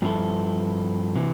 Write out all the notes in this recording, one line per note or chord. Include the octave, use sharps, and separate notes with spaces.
G2 F3 C4 E4 A4
C3 E3